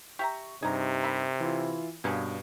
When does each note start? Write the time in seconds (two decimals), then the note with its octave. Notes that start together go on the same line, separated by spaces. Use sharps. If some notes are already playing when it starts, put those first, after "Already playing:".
0.19 G4 E5 A#5 C#6
0.62 G2 C3 D#4 G#4 A#5
1.03 A#4 E5 B5
1.40 E3 E4 F4
2.04 G2 B2 A#3 C#4 G#4